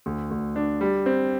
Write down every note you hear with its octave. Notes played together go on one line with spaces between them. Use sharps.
D2
D2
D4
G3
C4